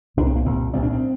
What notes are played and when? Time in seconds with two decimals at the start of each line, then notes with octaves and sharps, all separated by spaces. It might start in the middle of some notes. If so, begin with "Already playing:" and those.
0.17 C2 A#2 D4
0.26 C4
0.36 A#3
0.45 C2 A#2 C4
0.73 C2 C4
0.77 A#2
0.83 D4
0.92 C4